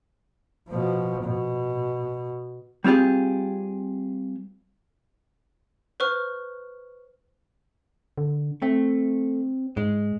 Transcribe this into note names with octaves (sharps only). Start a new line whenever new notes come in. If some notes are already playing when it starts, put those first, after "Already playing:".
B2 F3
B2
G3 C4 F4 G4 G#4
B4 C5 C#6 F6
D3
A3 C4
G#2 G#3